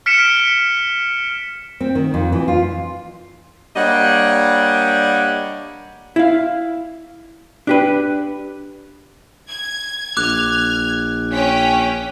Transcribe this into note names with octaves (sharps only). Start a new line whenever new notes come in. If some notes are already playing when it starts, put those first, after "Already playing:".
F6 B6 C#7 D7 E7
C4
D#3
F2
E3
F4
G3 A#3 D4 C#5 D#5 F#5
E4 F5
D4 G4 B4
G#6
A#1 D6 F6 F#6 G#6
C#4 G5 B6